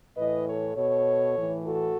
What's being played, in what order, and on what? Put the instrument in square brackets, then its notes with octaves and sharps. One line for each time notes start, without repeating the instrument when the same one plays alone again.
[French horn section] A2 E3 B4 D#5
A4 C#5
B2 A4 C#5
A2 E3
F#4 A4